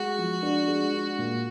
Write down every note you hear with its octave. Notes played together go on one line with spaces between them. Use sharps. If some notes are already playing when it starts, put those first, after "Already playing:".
Already playing: G#3 F#4
F3
D4
G#3
D4
A#2